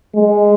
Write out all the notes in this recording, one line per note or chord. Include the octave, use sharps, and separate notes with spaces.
G#3